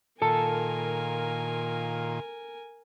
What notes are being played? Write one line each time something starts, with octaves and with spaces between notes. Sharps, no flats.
A#2 D#3 F4 A4 A#4 G#5 A5